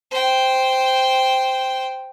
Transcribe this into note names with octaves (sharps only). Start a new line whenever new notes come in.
C5 G5